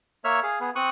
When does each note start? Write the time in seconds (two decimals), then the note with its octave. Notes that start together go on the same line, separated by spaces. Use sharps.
0.24 A#3 C#5 E5 F6
0.43 G#4 F5
0.61 B3 G#4
0.76 C4 C#6 D#6 F#6